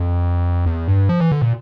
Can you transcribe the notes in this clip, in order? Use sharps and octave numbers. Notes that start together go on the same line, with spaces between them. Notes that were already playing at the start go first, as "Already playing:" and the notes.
Already playing: F2
E2
G2
F3
E3
D3
A#2